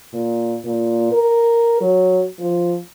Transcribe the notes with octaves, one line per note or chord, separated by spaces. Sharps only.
A#2
A#2
A#4
F#3
F3